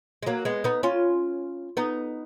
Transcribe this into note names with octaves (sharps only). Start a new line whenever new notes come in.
G#3
F#3 A#3
G#3 B3
B3 D#4
C#4 F4
B3 D#4